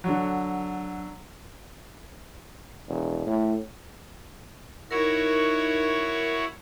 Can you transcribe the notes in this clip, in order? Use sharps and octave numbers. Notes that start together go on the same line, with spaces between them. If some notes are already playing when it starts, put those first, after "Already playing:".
D3 F#3
E1
A2
D#4 E4 F#4 A#4 C#5